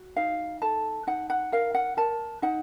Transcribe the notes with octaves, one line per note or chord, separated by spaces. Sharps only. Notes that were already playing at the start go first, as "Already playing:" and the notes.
Already playing: F#4
D#4 F5
A4 A5
D#4 F#5
F#5
A#4 F5
F#5
A#4 A5
D#4 F#5